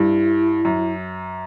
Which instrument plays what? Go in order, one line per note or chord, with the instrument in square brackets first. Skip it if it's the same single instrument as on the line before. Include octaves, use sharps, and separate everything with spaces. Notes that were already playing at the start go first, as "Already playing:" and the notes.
Already playing: [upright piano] G2 [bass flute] E4
[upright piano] F#2